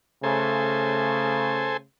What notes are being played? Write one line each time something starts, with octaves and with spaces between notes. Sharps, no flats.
C#3 A3 A4 C5 G#5